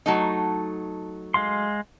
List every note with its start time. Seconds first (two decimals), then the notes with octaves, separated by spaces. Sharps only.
0.06 F#3 A3 D#4
1.34 G#3 F5 C6